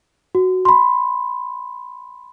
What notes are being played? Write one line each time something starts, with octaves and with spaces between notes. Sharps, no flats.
F#4
B5 C6